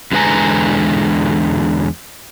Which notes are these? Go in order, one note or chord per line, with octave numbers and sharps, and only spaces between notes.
E2 D3 G#3 B4 G#5 A#5